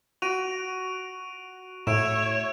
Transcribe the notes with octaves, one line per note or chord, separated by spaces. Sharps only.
F#4 D7 D#7 F7
A2 C#5 E5 D7 E7